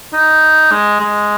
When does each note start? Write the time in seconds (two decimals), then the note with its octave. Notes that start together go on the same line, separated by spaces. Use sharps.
0.13 D#4
0.71 G#3
1.00 G#3